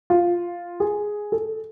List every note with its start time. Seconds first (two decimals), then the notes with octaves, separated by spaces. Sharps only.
0.10 F4
0.80 G#4
1.32 A4